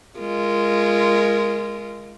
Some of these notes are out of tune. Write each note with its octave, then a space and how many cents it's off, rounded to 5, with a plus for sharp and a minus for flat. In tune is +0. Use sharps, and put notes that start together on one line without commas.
G#3 +0 F4 -20 A#4 +0